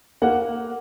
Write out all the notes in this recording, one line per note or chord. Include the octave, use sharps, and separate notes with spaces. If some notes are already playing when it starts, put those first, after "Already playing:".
A#3 F#5